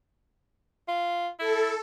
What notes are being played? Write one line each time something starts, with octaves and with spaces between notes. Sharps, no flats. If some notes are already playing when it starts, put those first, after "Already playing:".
F4
E4 A4